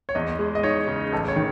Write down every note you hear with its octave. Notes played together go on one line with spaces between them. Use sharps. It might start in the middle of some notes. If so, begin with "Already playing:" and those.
C#5
E2 D#5
G#3
D#5
D#4 C#5
C#3
A1 A4
C#5
D#3